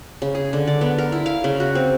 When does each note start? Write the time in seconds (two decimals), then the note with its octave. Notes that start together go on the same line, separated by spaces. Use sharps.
0.22 C#3
0.35 G#4
0.53 D3
0.67 D5
0.81 B3
0.98 A#4
1.12 E4
1.26 F5
1.44 C#3
1.60 F#4
1.75 C4